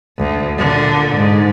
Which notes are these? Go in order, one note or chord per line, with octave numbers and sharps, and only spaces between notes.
D2
A#2 D3
G#2